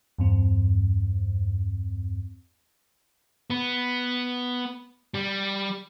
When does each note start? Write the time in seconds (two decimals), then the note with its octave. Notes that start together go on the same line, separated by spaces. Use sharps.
0.18 E2 G2 C4
3.50 B3
5.14 G3